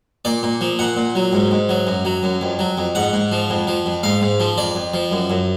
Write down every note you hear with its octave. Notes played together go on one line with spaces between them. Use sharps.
A#2 D5
A#2
F3
A#2 F#5
A#2
F#3
G#2
G#2
F#3
F#2
F#3
F#2
F2
F#3
F2
G#2 F#5
G#2
F3
F2
F3
F2
G#2 F5
G#2
F3
F2 D5
F2
F3
F#2
F#2